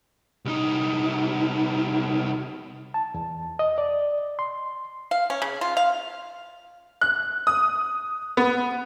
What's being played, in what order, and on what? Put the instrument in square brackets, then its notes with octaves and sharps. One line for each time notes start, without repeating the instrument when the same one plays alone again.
[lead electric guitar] C2 D#4
[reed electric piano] A5
E2
D#5
D5
C6
[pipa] F5
C#4
C#3
F4
F5
[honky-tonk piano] F#6
D#6
B3